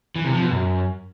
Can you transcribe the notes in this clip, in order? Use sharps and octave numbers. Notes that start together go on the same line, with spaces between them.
E3
C3
F3
B2
F#2